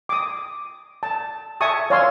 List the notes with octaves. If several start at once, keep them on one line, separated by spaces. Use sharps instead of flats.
D6 D#6
A5
E5 G#5 A5 C#6 D#6
C#5 D5 F5 G#5 C6 E6